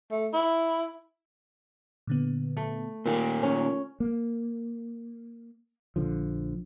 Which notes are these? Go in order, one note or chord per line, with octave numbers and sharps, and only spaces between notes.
A3
E4
A#2 D3 B3
A3
A#2 D#3 A#3 F4 A#4
C#4
A#3
A#1 D3 F3